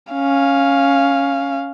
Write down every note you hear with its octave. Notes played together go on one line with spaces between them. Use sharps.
C#4 F5